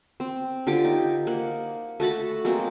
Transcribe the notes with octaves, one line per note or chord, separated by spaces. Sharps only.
C4
D3 F4 G4 D6
D#4
A#3 F#5
A3 F#4 A5 B5
F#3 G#3 A#3 C4